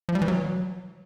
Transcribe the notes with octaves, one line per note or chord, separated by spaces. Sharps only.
F3
G3
E3
F#3